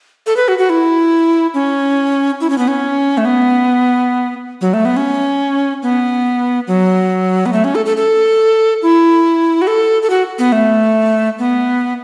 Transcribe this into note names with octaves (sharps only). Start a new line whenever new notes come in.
A4
B4
F#4
F#4
E4
C#4
E4
C#4
B3
C#4
A3
B3
F#3
A3
B3
C#4
B3
F#3
B3
A3
C#4
A4
A4
A4
E4
F#4
A4
A4
F#4
B3
A3
B3